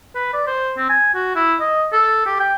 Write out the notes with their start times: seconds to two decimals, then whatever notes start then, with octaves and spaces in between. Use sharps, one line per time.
0.15 B4
0.33 D5
0.47 C5
0.77 C4
0.89 G#5
1.15 F#4
1.36 E4
1.61 D#5
1.93 A4
2.26 G4
2.40 G5